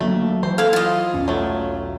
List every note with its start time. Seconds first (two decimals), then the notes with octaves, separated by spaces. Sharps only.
0.01 D2 F#3 A3 A#3
0.43 E3 C5
0.58 E4 A4 F5
0.73 F4 D#5
1.14 B1 E2 C#4
1.28 F#3 A3